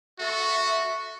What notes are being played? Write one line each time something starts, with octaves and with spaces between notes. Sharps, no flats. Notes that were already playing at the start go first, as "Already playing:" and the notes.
F#4 A4 E5 C#6